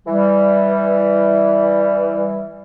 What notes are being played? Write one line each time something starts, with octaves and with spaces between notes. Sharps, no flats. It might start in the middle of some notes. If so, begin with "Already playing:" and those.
E3 G3